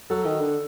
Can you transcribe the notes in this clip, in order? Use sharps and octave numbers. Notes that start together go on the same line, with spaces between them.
F#3 A4
D#3
D3